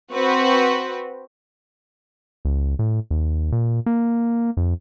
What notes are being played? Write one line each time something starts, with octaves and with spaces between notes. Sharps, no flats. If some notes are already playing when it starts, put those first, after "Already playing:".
C4 F#4 B4
C#2
A2
D#2
A#2
A#3
F2